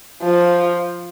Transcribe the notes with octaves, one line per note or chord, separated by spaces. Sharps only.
F3